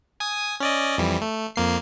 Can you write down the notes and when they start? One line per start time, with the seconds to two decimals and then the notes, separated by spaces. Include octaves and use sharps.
0.20 G#5 D#6
0.60 C#4 D5 D#5
0.98 F2 E3 G3
1.21 A3
1.56 F2 A#3 C7